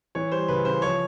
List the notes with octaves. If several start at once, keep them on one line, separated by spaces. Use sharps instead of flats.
E3 C#5
G3 C5
C#3 B4
C#3 C5
F3 C#5